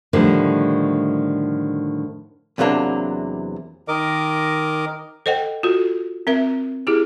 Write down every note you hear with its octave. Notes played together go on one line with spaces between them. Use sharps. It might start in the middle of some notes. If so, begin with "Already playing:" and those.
A2 D3 D#3 F3 G3
E2 C3 F#3 A#3 D4
D#3 A#4 D#5 D6
A4 C5 D#5 F#5 G5
F4 F#4 A4
C4 A#4 E5
E4 G4 G#4